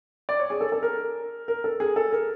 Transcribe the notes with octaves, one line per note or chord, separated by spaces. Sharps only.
D5
C#5
G#4
A4
A4
A#4
A#4
A4
G#4
A4
A#4